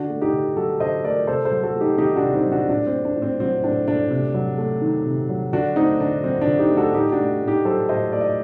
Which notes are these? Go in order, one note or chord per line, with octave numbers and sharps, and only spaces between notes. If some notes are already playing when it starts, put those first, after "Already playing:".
Already playing: D3 D4 F#4
A3
D#4 G4
D3
F#3 F#4 A4
D3 C5 D#5
A3 A#4 D5
C3 A4 C5
A4 C5
F#3
F#4 A4
A3
D#4 G4
D#3 D#4 G4
D4 F#4
C3
C4 D#4
F#3
D4 F#4
A2 D4
C4
A3
D4
A2
C4
F#3 C4
A2 D4
A3 D4
C3
F#3
A3
D#3
C3
F#3
D3 D4 F#4
A3 C4 D#4
D3 D4
F#3 C4
D4
D3
D#4 G4
A3
F#4 A4
A2 D#4 G4
D4 F#4
A3
A2
D#4 G4
F#3 A4 C5
A2 C5 D#5
A3 D5
D#5